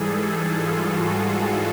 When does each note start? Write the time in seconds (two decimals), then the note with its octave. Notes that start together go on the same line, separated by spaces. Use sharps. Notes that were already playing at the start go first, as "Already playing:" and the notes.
Already playing: G#2 E3 G3 G#4 A4
0.46 F4
0.77 F#4
1.36 A4